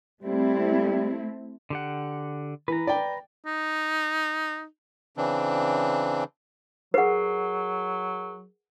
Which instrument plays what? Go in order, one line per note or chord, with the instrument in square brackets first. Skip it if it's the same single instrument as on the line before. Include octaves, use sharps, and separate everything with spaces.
[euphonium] G3 [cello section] A3 C4 E4
[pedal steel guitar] D3 G4 F#5
[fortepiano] E3 [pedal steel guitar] B4 A#5
[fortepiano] D5 G5
[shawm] D#4
[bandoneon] C#3 E3 C4 D4
[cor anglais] F#3 [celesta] G#4 A#4 C7 [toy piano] B4 F#5